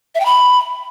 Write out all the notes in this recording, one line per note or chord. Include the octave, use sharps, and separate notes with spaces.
E5
G5
B5